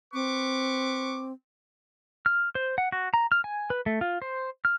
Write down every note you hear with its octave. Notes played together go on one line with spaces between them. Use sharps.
C4 B4 C#6 D6
F6
C5
F#5
F#4
A#5
F6
G#5
B4
A3
F4
C5
F6